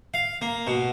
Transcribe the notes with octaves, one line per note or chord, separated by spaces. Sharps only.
F5
A#3
B2